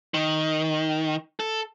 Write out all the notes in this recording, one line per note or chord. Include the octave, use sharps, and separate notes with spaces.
D#3
A4